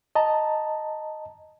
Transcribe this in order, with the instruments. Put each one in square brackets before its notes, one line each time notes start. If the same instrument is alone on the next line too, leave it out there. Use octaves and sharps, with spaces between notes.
[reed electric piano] D#5 A5 A#5